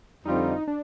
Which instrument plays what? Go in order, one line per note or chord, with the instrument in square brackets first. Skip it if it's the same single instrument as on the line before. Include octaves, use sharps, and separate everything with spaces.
[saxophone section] F2 D3 G3 C4 F4 [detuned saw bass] D#4
[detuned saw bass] D4